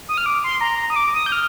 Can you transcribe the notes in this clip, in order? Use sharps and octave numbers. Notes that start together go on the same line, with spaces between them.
D#6
F6
D6
C6
A#5
D#6
D6
D#6
G6
F6